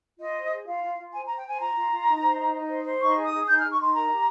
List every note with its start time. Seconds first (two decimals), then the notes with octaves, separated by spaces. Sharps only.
0.20 F4 D#5
0.35 C5
0.51 G#4
0.66 F4 F5
0.82 F4
0.98 F4
1.13 C5 G#5
1.25 A#5
1.29 C5
1.37 G5
1.44 C5 G#5
1.60 F4 A#5
1.76 F4
1.91 F4
2.07 D#4
2.22 C5
2.38 D#4
2.53 D#4
2.68 C5
2.84 C5
3.00 D#4 C#6
3.16 G#4
3.24 D#6
3.31 G#4
3.47 D#4 G6
3.58 F6
3.62 D#4
3.71 C#6
3.78 D#4 C6
3.94 A#4 A#5
4.09 G4